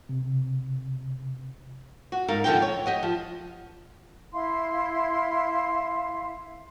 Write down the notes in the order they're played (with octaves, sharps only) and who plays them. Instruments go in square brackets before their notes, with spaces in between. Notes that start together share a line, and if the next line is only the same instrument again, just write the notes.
[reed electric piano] C3
[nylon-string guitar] F#4
G#2 D#4 A#4 F5
E2 D3 F3 G#3 D#4 G5
C#5
G4 D#5 F#5
F3
[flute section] E4 E5 F5 C6